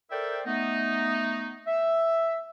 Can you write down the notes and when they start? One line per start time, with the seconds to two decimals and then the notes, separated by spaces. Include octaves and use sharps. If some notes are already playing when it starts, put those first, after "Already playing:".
0.11 A4 A#4 C5 D5 E5 G5
0.46 A3 B3 D#4
1.67 E5